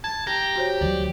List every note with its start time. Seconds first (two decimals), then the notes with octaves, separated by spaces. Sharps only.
0.04 A5 G#6
0.27 G4 A#5
0.56 F#4 C5 C#5
0.81 D2 E3 F#3 D5